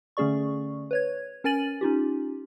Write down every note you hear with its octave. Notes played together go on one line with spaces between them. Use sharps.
D3 A3 C#4 G#4 D5 C#6
B4 C#5 G#6
C#4 A#4 G#5 A6 D#7 F#7
C#4 D#4 F4 G4